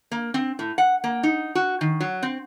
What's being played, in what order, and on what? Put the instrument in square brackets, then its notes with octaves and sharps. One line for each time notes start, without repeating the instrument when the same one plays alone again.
[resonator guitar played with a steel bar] A#3
C4
A2
F#5
A#3
D#4
F#4
D#3
F#3
C4